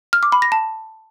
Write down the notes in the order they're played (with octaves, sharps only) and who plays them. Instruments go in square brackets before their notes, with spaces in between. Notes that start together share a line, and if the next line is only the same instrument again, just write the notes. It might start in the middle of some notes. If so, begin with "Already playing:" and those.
[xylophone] F6
D6
B5
A#6
A5